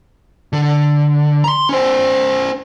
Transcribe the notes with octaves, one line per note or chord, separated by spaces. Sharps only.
D3
A#5 C6
C#4 C5